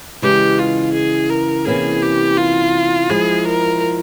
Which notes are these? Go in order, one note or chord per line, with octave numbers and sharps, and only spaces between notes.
C#3 E3 G#3 G4
F4
G#4
A#4
C3 E3 A#3 C#4 G#4
G4
F4
F3 G#3 E4 G#4
A#4